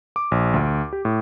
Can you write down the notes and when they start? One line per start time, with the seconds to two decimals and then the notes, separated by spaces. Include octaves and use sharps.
0.16 D6
0.32 A#1
0.54 D2
0.93 G4
1.05 A2